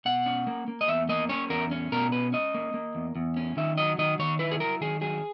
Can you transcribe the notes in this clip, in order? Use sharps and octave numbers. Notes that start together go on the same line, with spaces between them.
B2 F#5
C#4
A#3
A#3
D#5
E2 E5
A#3 D#5
C#4 C#5
E2 A#4
C#4
B2 A#4
C#4 B4
C#4 D#5
A#3
A#3
E2
E2
C#4
D#3 E5
F#3 D#5
D#3 D#5
D#3 C#5
E4 B4
G#4
F#3 A#4
D#3 G#4
F#3 G#4